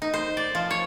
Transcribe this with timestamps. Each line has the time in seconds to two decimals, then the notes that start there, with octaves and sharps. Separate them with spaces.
0.02 D#4
0.14 C5
0.37 D5
0.55 F3
0.71 C#5